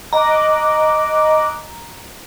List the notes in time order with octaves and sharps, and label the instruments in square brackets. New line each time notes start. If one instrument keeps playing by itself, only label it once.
[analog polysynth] D#5 D6 F#6 [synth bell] A#5